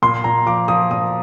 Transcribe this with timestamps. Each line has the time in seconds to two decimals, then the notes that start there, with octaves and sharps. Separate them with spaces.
0.02 A#2 C6
0.24 A#2 A#5
0.46 F3 D6
0.68 F3 D#6
0.91 A#2 D#6